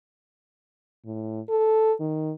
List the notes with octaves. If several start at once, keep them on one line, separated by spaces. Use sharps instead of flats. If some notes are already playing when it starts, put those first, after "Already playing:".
A2
A4
D#3